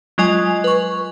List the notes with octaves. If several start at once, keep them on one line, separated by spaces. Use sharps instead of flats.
F#3 G#3 F4 D#5 G#5 F7
B4 C#6